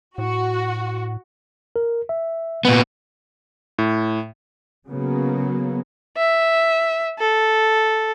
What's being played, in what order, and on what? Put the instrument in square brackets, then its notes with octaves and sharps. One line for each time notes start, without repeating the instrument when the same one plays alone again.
[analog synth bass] A2 [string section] F#4
[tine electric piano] A#4
E5
[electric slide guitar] A#2 B3
[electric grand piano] A2
[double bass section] C#3 F#3 A#3 B3
[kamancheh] E5
A4